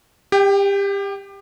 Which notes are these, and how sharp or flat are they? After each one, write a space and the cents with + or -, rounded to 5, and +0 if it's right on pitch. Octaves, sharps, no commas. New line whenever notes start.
G4 +25 G5 -10